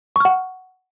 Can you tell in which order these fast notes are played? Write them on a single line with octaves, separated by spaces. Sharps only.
C#6 F6 F#5